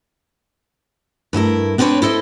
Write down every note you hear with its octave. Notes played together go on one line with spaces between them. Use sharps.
G2 A3 E4 A#4
B3 C4 D4 A#4 B4 C#5
E4 A4 C5 D#5